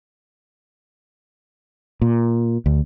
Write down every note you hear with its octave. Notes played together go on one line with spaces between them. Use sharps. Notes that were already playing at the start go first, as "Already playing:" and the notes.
A#2
D2